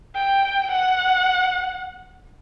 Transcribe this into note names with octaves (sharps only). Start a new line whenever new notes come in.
G5
F#5